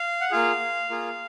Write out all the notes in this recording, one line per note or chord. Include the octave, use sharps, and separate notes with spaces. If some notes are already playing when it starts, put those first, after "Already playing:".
Already playing: F5
F#5
A#3 F4 G#4 F5
A#3 F4 G#4